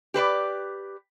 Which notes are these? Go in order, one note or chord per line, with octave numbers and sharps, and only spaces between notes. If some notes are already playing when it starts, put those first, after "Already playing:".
G4 B4 C5 D5